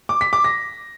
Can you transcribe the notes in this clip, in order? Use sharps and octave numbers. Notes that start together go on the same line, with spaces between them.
D6
B6
D6
A#6